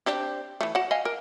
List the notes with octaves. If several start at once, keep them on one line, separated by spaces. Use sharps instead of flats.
C4 D4 G4
E3 A3
F#4 F#5
D#5 F5 G#5
A#4